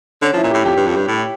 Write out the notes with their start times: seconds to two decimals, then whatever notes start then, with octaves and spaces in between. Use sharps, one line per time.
0.22 D3 C#4
0.34 F3
0.37 E4
0.43 A#2
0.51 A2 G4
0.64 F2 G4
0.76 G2
0.87 F2
0.96 G2
1.08 A2